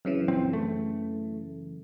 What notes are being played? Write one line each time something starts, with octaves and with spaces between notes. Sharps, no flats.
F#2 C#3 E3
A#1 C4
A3